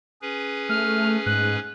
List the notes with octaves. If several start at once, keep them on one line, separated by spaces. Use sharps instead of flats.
C#4 G#4 B4
A3 F6
G#2 F#6